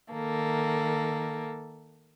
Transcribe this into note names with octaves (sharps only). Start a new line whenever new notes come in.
D#3 A#3 A4